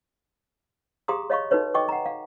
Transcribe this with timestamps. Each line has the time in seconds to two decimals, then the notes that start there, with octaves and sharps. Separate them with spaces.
1.08 G4 G#4 F5 A#5 C6 D#6
1.30 C#5 D#5 F5 B5 C#6
1.51 D#4 F#4 A4 B4 C#5
1.74 D#5 G5 C#6 D6
1.89 F#5 A#5
2.06 F5